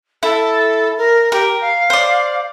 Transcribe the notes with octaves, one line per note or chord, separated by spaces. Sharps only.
E4 A4
A#4
G4 A#4
F5
C5 D5